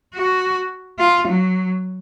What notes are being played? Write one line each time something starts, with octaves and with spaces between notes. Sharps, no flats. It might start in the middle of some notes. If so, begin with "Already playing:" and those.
F#4
F4
F#3